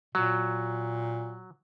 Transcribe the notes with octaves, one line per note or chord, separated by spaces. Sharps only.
A#2 F#3